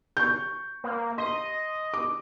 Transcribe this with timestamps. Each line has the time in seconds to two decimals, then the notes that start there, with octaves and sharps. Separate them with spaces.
0.17 C#6 G6
0.84 A#3
1.18 D#5 C6
1.94 D6